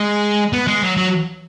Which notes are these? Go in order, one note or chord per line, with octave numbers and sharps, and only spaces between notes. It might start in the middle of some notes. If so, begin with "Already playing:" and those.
Already playing: G#3
B3
G#3
F#3
F#3